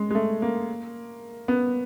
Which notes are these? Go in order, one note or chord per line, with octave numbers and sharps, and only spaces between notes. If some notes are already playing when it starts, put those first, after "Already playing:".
Already playing: G#3
G#3
A3
A#3
B3